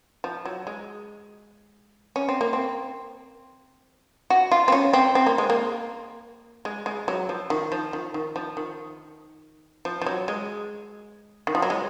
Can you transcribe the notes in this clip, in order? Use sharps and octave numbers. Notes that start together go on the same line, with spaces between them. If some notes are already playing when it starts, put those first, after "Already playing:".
F3
F#3
G#3
C#4
C4
A#3
C4
F#4
F4
C4
C#4
C4
C4
A#3
G#3
A#3
G#3
G#3
F#3
F3
D#3
F3
D#3
D#3
F3
D#3
F3
F3
F#3
G#3
D#3
F3
F#3
G#3